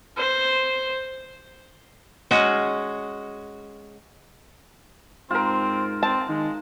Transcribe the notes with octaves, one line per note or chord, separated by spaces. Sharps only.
C5
G#3 C#4 F#4
G#2 C4 F4 A#4
C4 A5
D#3 G#3